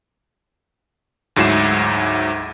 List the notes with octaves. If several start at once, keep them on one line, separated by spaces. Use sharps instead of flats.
D2 G#2 F#3 E4 C7 E7